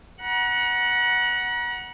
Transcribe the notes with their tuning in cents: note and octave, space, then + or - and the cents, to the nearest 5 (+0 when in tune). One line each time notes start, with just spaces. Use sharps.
F#5 +0 A#5 +45